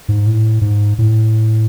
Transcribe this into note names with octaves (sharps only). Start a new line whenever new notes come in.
G#2
A2
G#2
A2